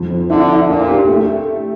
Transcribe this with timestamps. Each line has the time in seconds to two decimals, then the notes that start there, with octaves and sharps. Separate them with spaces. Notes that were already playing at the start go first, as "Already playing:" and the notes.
Already playing: F2
0.10 C4
0.30 D3 E4
0.50 E4
0.69 A#2 D4
0.89 G4
1.08 A3